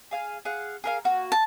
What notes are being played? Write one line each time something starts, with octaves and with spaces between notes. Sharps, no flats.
G#4 F5 G#5
G#4 F5 F#5
G#4 A#4 F5
A#3 F#4
A5